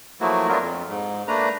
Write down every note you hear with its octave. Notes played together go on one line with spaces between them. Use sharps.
F3 F#3 A3 A#3 E4 F#4
F#3 A3 B3 D4 F4 A#4
F2
G#2
A3 A#3 D4 B4 A#5